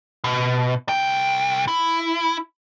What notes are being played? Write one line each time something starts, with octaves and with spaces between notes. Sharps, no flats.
B2
C2 G5
E4